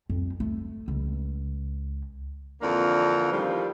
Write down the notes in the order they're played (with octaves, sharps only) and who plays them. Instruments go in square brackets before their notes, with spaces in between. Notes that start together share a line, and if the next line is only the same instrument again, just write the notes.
[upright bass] F2
A3
C#2
[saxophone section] F2 D3 E3 A#3 D4
A2 D#3 F3 G3